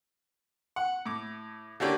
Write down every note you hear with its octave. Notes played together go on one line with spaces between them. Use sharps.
F#5
A2 D6
D3 A#3 C#4 G4 D5